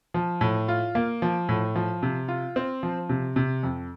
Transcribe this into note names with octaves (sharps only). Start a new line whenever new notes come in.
F3
A2
F4
A#3
F3
A2
F3
C3
F4
C4
F3
C3
C3
F2